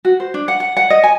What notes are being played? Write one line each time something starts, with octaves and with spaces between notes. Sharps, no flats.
F#4
C5
D4
F#5
F#5
F#5
D#5
G#5